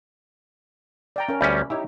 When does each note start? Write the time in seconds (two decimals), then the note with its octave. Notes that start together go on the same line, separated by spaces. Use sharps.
1.16 D5 G5 A#5
1.29 C#4 A#4
1.41 D2 G3 C#4 E5 B5
1.70 D#4 E4 G4 C#5